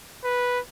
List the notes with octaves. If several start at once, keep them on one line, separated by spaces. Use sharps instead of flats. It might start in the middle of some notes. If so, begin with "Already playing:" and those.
B4